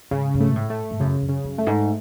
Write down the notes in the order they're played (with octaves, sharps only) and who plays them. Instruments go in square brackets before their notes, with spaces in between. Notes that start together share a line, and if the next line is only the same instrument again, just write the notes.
[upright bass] G#2 [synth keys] C#3
[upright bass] G#2
[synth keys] A3
[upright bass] B2
A2
[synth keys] A3
[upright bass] G#2
[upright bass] F#2 [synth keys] C#3
[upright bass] F#2
[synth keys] C#3
[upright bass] F#2
[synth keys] A3
[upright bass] G#2